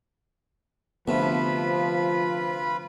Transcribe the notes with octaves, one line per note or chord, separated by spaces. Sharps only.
D2 C3 F3 B3 F4 B4 B5